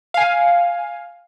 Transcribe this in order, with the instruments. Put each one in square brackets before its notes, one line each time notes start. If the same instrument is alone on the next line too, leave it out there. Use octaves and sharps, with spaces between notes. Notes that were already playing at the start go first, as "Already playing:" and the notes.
[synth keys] F5 G#5